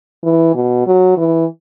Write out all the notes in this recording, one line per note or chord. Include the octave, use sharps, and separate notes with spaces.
E3
B2
F#3
E3